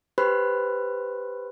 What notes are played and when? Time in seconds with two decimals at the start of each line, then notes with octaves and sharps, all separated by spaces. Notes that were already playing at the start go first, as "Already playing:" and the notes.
0.18 G4 B4 C5 B5 F#6